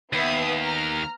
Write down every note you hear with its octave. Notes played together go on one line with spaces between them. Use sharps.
D#2 B3 E5 D#6
A#5 F6